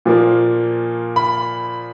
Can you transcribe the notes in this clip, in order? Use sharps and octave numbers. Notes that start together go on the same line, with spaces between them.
A#2 F3 A#3
B5